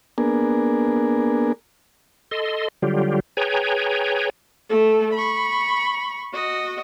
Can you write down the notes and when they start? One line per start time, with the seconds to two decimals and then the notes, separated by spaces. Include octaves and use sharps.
0.18 A#3 B3 D4 G#4 A#4
2.31 A4 D#5 C6
2.82 D3 F#3 G3 F4 G4
3.37 G#4 B4 C#5 G5 G#5 A#5
4.69 A3 A4
5.13 B5 C#6
6.33 F#4 D#5